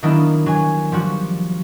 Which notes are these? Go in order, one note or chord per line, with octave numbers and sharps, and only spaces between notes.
D#3 F#3 A#3 B3 D4 E4
F#3 G#5
F3 G3 F#4